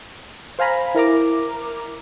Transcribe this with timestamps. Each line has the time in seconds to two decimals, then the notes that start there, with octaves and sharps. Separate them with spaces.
0.59 C5 F5 G#5 A#5 B5
0.95 E4 A#4 A#5 D6